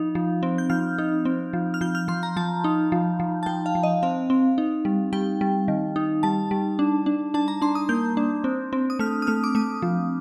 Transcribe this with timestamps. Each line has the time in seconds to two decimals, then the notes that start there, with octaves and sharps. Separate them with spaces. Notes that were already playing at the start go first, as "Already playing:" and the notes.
Already playing: F3 D#4
0.15 F3
0.43 C4
0.58 G6
0.70 F3 F6
0.98 D#4
1.25 C4
1.53 F3
1.74 F6
1.81 F3 G6
1.95 F6
2.08 F3 C6
2.23 A#5
2.37 F3 A5
2.64 D#4
2.92 F3
3.20 F3
3.43 A5
3.46 F3 G5
3.66 F5
3.75 F3
3.83 D#5
4.03 C4 F5
4.30 C4
4.58 D#4
4.85 G3
5.13 G3 G5
5.41 G3
5.68 D#3
5.96 D#4
6.23 G3 A5
6.51 G3
6.79 D4
7.06 D4
7.34 D4 A5
7.48 A#5
7.62 D4 C6
7.75 D#6
7.89 A#3 G6
8.17 D4
8.44 C4
8.73 C4
8.90 D#6
8.99 A3 F6
9.22 D#6
9.27 A3 F6
9.44 D6
9.55 A3 D#6
9.82 F3